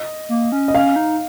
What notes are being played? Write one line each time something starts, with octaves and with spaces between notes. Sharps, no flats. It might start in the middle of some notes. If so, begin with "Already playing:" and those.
Already playing: D#5
A#3
C#4
D#5
C#4 F5
D#4